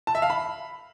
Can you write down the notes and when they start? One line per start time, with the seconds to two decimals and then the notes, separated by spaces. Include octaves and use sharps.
0.07 A5
0.15 E5
0.22 F5
0.30 B5